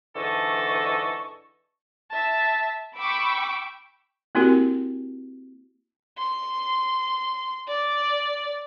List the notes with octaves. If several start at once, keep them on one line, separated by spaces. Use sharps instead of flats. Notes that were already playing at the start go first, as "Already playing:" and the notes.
G#2 D3 E3 A4 D#5 C#6
E5 A5
G5 B5 C#6 D6 E6
A#3 C4 E4 F#4 G4 A#4
C6
D5